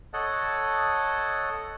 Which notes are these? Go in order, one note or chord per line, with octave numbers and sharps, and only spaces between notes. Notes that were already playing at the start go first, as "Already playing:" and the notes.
A4 C#5 D#5 F#5 A5